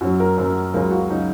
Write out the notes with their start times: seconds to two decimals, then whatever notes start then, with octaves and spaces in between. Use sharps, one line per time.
0.01 F#2 F#3 F#4
0.20 A#4
0.38 F#2 F#3 A#4
0.74 C#2 C#3 F#3 A#4
0.91 F#4
1.10 C#3 F#3 D#4